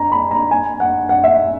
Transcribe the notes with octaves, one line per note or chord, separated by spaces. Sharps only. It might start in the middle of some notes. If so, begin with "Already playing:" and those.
Already playing: G#5 A#5
B5
A#5
G#5
F#5
F#5
E5